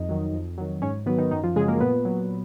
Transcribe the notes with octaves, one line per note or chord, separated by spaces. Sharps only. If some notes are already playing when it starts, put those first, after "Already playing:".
Already playing: F2 D#4 D#5
D#3 F#3
F2
D#3 F#3
G#2 C#4 C#5
D#3 F#3 B3 B4
D#3 D#4
F#2 D#3 D#4
F3 F4
C#3 F#3 G#3 G#4
A#3 A#4
A#2 B3 B4
F#3